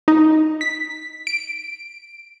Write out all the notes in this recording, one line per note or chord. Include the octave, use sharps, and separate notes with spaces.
D#4
B6
D7